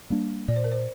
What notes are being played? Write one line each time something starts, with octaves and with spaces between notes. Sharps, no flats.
G3 A#3 D4
A#2 D5
C5
A#4
C5